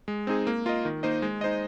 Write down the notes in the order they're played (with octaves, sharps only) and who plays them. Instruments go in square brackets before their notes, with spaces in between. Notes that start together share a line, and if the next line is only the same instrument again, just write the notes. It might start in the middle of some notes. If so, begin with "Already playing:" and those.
[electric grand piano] G#3
C4 D#4 G#4
A#3
F4 A#4 D#5
D#3
A#3 D#4 C5 D#5
G#3
D#4 C5 D#5